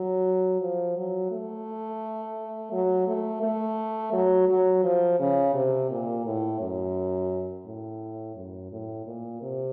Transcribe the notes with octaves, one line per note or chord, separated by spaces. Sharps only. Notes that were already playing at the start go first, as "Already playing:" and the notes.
Already playing: F#3
F3
F#3
A3
F#3
A3
A3
F#3
F#3
F3
C#3
C3
A#2
A2
F#2
A2
F#2
A2
A#2
C3